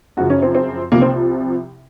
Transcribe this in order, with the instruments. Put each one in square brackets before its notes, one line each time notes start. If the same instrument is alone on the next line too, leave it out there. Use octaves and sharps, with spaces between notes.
[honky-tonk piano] F#2 C#3 F3 F#4
C#4
C4
C4
C2 C3 F3 A#3
C4